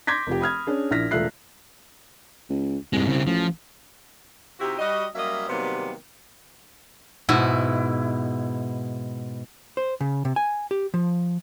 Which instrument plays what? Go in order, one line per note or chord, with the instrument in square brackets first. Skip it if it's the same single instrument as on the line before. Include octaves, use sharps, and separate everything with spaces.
[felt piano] C6 D6 G6 G#6 A#6 B6
F1 F3 G4
B5 D#6 F6 G#6
C#4 D4 G#4
A#1 E4 F6 A#6 B6
E1 A3 F4 E5 F#6 C7
[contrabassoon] C#2
[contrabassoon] C2 [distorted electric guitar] G2 G#3
[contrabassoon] C2 [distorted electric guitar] C#3 C4
[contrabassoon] A1 [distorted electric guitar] F3
[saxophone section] C3 D#4 E4 F#4 G4
G3 F#4 D#5
F#3 G3 A#3 C#4 D#5 E5
C3 D#3 F#3 G3 A#3 B3
[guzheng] G#2 B2 E4
[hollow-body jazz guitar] C5
C#3
C3
G#5
G4
F3